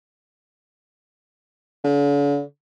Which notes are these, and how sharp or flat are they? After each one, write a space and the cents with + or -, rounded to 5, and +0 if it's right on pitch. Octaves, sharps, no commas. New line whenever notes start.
D3 -45